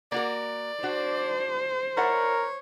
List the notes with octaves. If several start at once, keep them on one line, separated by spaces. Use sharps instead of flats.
A#3 F#4 A#4 D5
D4 F#4 C5
E4 A#4 C#5 D5 F#5